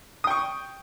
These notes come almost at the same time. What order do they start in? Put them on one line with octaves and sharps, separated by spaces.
D#6 G5 C#6